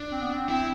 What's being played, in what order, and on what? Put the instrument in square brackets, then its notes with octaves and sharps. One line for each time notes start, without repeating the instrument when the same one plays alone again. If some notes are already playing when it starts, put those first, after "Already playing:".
Already playing: [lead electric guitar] D4
[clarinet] C4
B3
C4
[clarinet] C4 [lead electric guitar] E4